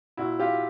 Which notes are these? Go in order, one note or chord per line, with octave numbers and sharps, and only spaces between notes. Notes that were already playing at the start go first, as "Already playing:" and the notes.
A#2 E4 F#4
F4 G4